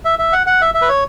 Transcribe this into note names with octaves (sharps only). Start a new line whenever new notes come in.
E5
E5
F#5
F#5
E5
E5
B4
C#5